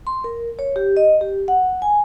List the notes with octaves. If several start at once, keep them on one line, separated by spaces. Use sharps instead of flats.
C6
A#4
C#5
G4
D#5
G4
F#5
G#5